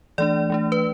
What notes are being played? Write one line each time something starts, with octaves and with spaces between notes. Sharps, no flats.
E3 A3 D4 D5
E3 A3 D4
B4